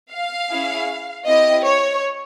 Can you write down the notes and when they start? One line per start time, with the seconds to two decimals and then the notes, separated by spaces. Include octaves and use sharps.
0.11 F5
0.49 C#4 E4 G#4
1.25 C4 E4 G4 D#5
1.64 C#5